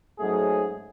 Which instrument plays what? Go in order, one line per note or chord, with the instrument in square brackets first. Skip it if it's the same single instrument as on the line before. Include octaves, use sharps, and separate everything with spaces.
[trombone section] G#2 F#3 A3 C#4 G#4